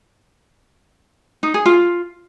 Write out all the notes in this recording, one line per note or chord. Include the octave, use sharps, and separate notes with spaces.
D#4
G#4
F4